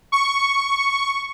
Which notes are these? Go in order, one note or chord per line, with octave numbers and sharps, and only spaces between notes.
C#6